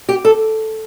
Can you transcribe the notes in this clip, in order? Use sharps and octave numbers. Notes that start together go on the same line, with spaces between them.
G4
A4